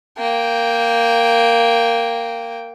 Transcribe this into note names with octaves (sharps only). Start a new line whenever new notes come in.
A#3 G5